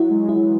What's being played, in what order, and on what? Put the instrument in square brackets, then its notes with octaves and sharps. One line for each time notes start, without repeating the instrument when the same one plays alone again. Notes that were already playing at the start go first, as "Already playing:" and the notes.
Already playing: [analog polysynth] F#3 [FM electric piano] E4
[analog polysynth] G#3
[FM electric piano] E4
[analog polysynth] E3
F#3